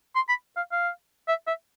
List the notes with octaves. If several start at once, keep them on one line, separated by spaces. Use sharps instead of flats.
C6
B5
F5
F5
E5
E5